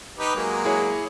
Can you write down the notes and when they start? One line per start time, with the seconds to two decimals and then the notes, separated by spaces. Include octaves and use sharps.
0.19 D#4 G4 B4
0.36 F#3 G#3 A#3
0.65 E4 G#4 C#5